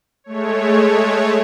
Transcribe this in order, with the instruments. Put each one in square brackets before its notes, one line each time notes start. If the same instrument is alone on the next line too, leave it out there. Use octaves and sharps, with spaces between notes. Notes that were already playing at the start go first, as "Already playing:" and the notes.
[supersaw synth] G#3 A3 C#5